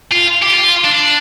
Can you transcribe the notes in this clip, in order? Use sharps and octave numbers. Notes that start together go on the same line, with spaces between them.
F4
G4
F4
D4